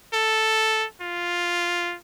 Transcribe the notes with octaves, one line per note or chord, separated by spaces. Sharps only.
A4
F4